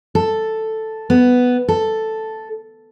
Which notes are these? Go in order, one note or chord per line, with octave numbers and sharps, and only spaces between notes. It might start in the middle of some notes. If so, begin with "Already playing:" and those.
A4
B3
A4